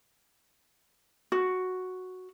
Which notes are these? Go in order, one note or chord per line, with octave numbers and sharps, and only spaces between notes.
F#4